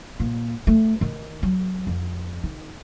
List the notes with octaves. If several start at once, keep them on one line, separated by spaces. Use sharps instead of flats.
A#2
A3
D#3
F#3
F2
D#3